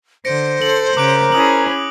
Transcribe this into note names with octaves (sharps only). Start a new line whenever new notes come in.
D3 C5 A#6 C#7 D7
A4 F#7
C#3 A#4 D6 F#6 D7
C#4 E4 G#4 D#6 F#7